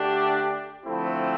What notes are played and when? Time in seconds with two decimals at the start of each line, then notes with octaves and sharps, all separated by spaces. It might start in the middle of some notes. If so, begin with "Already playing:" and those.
Already playing: D3 A3 D4 G4
0.84 D3 F3 A3 C4 E4